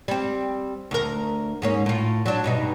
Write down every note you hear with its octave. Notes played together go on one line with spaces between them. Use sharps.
G3 C4
D2 A#4
G#2 A#3 C#4
A2 F4
F#3 D4
G2 B2 D#4